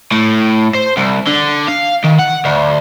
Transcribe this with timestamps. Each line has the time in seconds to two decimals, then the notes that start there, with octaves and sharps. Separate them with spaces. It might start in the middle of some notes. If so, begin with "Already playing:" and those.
0.12 A2
0.75 C5
0.97 C2
1.27 D3
1.68 F5
2.04 D#3
2.19 F#5
2.45 D2